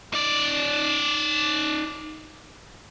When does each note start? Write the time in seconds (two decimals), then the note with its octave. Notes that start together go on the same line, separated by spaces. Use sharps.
0.13 D#4 D5